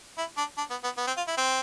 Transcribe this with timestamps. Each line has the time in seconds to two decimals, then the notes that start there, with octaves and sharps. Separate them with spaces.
0.18 E4
0.37 D4
0.58 D4
0.70 B3
0.84 B3
0.97 B3
1.07 C4
1.17 F4
1.27 E4
1.37 C4